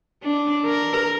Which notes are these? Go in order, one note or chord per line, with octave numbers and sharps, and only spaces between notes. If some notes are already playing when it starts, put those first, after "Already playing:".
D4
A#4